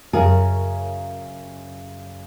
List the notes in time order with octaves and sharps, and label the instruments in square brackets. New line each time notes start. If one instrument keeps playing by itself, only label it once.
[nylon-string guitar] F#2 C#3 G#4 A#4